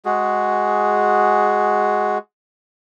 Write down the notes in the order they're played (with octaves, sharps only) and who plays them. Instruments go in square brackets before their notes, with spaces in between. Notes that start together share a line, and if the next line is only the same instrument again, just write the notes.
[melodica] G#3 F#4 G#4